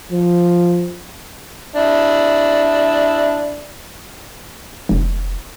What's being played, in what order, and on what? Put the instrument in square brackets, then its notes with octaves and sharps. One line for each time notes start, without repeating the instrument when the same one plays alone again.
[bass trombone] F3
[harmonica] D4 E4
[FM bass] F1